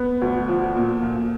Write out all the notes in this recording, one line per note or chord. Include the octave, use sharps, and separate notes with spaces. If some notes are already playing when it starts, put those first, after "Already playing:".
Already playing: B3
D2
F3
A#2
A#2